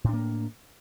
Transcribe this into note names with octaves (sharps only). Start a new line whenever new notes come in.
A2 A#3 D4